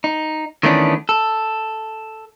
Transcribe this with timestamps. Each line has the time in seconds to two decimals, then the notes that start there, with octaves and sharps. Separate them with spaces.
0.04 D#4
0.63 D#3 E3 A3 B3 C#4 D4
1.09 A4